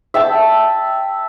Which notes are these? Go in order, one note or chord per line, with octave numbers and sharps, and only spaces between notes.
E5 G5 A5